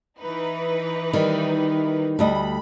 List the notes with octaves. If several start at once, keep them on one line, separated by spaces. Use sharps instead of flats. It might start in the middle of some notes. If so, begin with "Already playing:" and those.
E3 D#4 B4
D#3 G3
D2 G3 D#5 B5